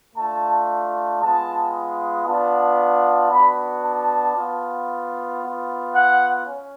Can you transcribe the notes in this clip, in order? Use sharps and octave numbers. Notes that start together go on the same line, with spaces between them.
A3 D4 F4 A5
G#3 B3 F4 A5
B3 D4 F4 A5
B3 D4 F#4 B5
A5
B3 F4
B3 F4
F#5
C#4